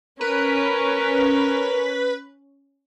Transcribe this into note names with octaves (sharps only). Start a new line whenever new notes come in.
C#4 A#4 B4